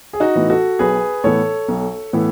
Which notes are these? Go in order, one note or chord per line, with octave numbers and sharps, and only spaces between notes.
G#4
D#4 F#4
A2 E3 B3
F#4 A4
B1 G#4 B4
A2 E3 B3 A4 C#5
B1
A2 E3 B3